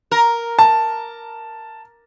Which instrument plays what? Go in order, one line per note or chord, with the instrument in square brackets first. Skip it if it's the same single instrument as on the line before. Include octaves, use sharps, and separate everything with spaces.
[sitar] A#4
[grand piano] A5